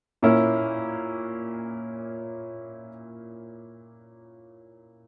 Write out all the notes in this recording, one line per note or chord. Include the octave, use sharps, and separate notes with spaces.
A#2 A#3 C#4 E4